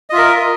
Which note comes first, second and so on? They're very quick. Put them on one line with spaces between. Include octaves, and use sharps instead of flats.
D#5 F4 E5 A#4